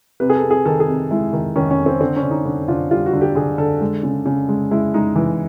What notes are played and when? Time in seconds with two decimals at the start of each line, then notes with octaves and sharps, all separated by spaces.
0.20 C3 B4
0.30 G#4
0.35 A4
0.43 C3
0.50 G#4
0.65 D#3 A4
0.80 G#4
0.88 C3
1.11 G#3 E4
1.33 D#3
1.56 D#3 C#4
1.71 C#4
1.78 C3
1.86 C4
2.00 D3 C4
2.16 C#4
2.23 D3
2.31 D#4
2.45 D3
2.68 D3 F4
2.91 G3 F4
3.06 F#4
3.13 D3
3.21 G4
3.35 D3 G#4
3.58 D3 A4
3.81 G#3
4.03 C#3
4.26 C#3
4.49 G#3
4.71 G#3 E4
4.94 G#3 D#4
5.16 E3